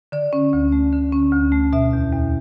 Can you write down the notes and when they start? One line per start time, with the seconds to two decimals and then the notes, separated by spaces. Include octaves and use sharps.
0.12 D3 D5
0.33 C#4
0.53 D2
0.72 A3
0.93 D3
1.12 C#4
1.33 D2
1.52 A3
1.73 B2 E5
1.93 E2
2.13 E2